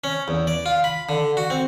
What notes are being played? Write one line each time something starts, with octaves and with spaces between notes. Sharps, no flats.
C#4
E2
D5
F4
B5
D3
F#4
C4